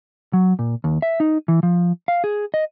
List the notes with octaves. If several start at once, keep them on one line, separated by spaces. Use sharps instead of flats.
F#3
A#2
D#2
E5
D#4
E3
F3
F5
G#4
D#5